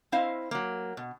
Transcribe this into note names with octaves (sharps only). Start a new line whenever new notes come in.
C4 E4 C5 D#5 F5
F#3 A#3
B2